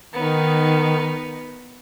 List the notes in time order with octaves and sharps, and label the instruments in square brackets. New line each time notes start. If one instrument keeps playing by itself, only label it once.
[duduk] D#3 [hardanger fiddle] B3 D#4